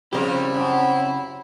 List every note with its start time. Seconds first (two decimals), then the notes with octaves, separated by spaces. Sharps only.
0.13 C#3 F3 G3 C4 E4 G4 A#4
0.54 F#2